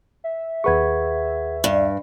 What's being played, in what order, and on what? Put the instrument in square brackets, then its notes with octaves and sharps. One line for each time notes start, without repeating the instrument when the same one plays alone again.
[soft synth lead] E5
[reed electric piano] D#2 B4 C#6 [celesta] G#4 F#5 G#6
[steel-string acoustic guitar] G2